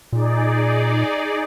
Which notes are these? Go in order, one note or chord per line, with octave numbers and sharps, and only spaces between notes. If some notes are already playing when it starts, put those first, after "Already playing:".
A#2 D#4 G#4 D5